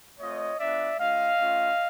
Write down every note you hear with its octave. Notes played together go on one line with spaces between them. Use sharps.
A3 C4 F4 C#5 D#5
B3 D4 F4 D5 E5
G#3 C#4 F4 D#5 F5
A3 C#4 F4